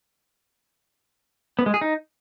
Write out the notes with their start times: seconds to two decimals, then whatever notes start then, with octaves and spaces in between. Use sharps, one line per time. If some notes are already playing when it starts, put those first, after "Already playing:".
1.59 B3
1.66 G#3
1.74 G#4
1.81 D#4